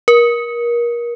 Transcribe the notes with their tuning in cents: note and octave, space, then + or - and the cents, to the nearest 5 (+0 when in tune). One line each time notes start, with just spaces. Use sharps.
A#4 +30